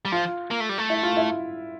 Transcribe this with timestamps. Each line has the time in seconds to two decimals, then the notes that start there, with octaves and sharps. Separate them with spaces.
0.05 G3
0.12 F3 F4
0.51 A#3
0.60 A3
0.69 G3
0.78 A3
0.90 E4
1.03 F4
1.17 E4